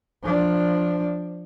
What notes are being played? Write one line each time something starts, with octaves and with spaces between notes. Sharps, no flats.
F3 D4